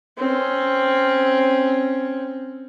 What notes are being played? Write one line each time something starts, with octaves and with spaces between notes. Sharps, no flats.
C4 C#4